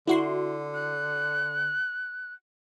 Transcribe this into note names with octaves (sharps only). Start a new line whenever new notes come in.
D3 E4 F#4 C6
F#6